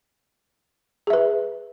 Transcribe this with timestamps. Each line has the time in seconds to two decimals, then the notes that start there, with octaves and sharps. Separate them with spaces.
1.07 G#4
1.10 E5
1.13 B4